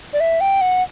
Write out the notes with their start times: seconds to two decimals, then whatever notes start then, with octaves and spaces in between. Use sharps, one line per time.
0.13 D5
0.20 E5
0.41 G5
0.61 F#5